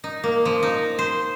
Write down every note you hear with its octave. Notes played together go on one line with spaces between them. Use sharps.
D#4
A#3
F3
D#4
C5